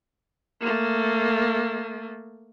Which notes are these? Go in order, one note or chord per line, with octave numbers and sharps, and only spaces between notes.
A3 A#3